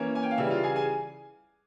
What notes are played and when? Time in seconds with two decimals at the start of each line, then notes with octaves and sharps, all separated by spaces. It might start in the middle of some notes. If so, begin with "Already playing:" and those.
Already playing: E3 A#3 C#4 C#5
0.15 G#5
0.23 G5
0.31 F5
0.38 C#3 E3 G3 E4 E5
0.50 F4 F5
0.63 G#4 G#5
0.76 G#4 G#5